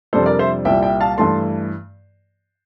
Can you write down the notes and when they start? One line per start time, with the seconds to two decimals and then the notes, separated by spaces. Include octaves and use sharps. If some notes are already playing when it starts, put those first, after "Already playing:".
0.13 F2 C3 G3 D4 A4 C5
0.26 A#4 D5
0.39 C5 E5
0.65 C2 A#2 G3 E5 G5
0.83 E5 G5
1.00 F5 A5
1.18 G2 E3 A3 A5 C6